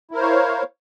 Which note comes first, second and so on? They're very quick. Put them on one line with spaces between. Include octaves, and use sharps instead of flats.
E4 A#4 C5 C#5 F5